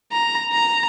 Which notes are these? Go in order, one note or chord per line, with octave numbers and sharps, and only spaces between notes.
A#5
A#5